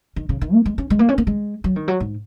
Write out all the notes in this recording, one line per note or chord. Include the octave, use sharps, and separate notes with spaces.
D#3
C#3
D#3
A#3
G#3
C#4
G#3
A#3
C#4
A#3
G#3
F#3
D#3
F#3
G#2